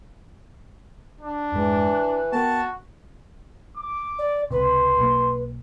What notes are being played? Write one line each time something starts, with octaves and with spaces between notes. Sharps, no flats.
D4
F2 G#2 E3 G#3
F#6
B3 F#4 A#4 G5 A5
D6
D5
C#2 C3 B4 C6
B1 A#3